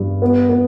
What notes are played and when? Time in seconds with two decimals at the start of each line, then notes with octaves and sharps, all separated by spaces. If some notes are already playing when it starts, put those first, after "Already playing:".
Already playing: G2
0.22 B3
0.49 B3